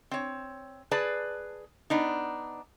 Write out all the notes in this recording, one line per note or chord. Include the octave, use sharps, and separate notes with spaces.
C4 C#5
G#4 B4 D5 A5
B3 D4 D#4